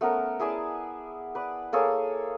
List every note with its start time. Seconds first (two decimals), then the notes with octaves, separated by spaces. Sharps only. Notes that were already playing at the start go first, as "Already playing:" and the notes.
0.01 A3 B3 C#4 A#4
0.40 E4 G#4 D5 A5
1.35 B4 D5
1.73 A#3 G#4 A4 C#5